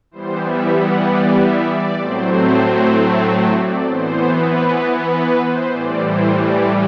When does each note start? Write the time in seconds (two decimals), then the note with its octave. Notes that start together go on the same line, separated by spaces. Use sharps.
0.11 E3 G3 B3 C5
0.42 E5
0.74 F#5
1.05 D5
1.36 E5
1.67 D5
1.98 A2 F#3 A3 C4 C5
2.30 C5
2.61 C5
2.91 A4
3.54 D5
3.85 E3 B3 C5
4.32 B4
5.09 B4
5.41 C5
5.72 A2 E3 G3 D5
6.03 C5
6.34 D5